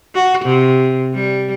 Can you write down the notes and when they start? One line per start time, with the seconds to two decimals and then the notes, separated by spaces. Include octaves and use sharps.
0.15 F#4
0.45 C3
1.14 G3